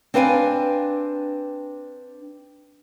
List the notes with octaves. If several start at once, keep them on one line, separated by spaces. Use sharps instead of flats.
C4 D4 B4 F5 G5 G#5